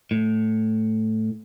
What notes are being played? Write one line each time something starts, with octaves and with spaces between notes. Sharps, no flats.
A2